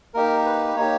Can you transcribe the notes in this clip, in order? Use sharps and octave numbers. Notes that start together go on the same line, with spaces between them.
A#3 D#4 G4 A#4
B4
A#3 D#4 G4 C#5